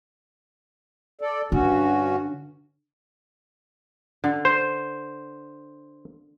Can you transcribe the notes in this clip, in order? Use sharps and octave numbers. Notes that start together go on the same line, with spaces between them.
A4 D5
G2 D3 C#4 F#4
D3
C5